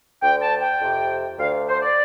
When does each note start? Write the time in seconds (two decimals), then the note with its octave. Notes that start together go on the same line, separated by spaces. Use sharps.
0.22 D2 D3 G5
0.42 A5
0.62 G5
0.80 F2 C3
1.38 D2 D3 F5
1.68 C5
1.82 D5